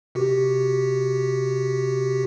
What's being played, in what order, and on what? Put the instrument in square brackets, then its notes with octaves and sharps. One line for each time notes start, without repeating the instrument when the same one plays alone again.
[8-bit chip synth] C3 F#4 G4